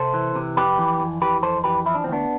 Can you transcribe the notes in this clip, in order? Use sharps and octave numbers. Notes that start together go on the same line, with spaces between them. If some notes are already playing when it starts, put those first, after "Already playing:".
Already playing: C3 A4 C5
E3
C3
F2 G4 B4
E3
F2
E3 G4 B4
F2 A4 C5
E3 G4 B4
F3 E4
D4
D2 C4
B3 D4